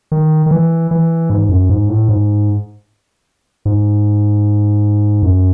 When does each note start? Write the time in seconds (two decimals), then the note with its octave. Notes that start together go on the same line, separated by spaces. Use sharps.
0.12 D#3
0.46 D#3
0.51 E3
0.91 E3
1.30 G#2
1.49 F#2
1.69 G#2
1.89 A2
2.08 G#2
3.65 G#2
5.23 F#2